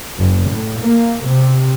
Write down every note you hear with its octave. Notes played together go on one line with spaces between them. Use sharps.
F#1
A2
A#3
C3